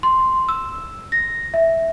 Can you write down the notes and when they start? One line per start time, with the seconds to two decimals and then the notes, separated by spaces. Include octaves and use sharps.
0.03 C6
0.49 E6
1.12 A#6
1.54 E5